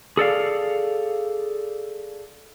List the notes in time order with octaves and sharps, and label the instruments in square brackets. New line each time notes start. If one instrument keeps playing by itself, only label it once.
[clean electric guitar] G#4 A4 D5 F5